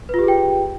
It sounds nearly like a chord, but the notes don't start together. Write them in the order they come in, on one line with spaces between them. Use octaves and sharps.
B4 F4 G4 G#4 G5